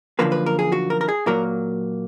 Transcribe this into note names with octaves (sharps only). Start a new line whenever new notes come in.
F#2 D3 F3 A#3 B4
B4
A#4
G#4
F#4
A#4
A#4
G#4
A#2 F#3 A#3 A#4